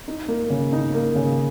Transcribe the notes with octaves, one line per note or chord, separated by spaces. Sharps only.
D#4
A#3
C#3
D#4
A#3
C#3